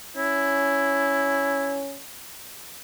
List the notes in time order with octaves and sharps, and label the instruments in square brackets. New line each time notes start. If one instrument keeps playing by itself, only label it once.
[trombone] C#4 [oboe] E4